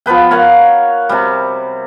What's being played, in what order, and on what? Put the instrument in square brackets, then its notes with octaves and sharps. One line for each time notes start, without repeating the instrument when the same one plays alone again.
[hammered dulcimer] F3 B3 B4 G5
A#4 C#5 F5 F#5
C3 G3